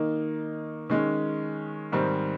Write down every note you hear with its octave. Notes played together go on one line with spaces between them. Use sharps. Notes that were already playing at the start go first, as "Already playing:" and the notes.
Already playing: D#3 A#3 D#4
D#3 G#3 C#4
G#2 D#3 G3 C4